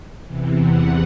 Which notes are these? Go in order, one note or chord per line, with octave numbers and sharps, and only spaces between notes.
E2 C3 E3
F#5